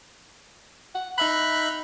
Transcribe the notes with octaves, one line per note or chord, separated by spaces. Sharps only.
F#5
D#4 E5 B5 F#6